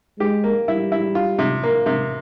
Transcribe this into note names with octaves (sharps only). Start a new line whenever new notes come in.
G#3 G4
A#3
G3 E4
E4
F4
C3
A#3
C3